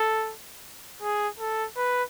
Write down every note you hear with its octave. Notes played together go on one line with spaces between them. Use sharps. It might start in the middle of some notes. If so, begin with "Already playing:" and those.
Already playing: A4
G#4
A4
B4